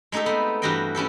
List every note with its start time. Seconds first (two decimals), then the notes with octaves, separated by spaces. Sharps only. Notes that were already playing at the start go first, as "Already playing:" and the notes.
0.12 G#3 A3 D#4 G4 A4
0.26 B3 C4
0.62 G2 E3 F#4 G4 D#5 G5
0.95 C#4 E4 G4 A4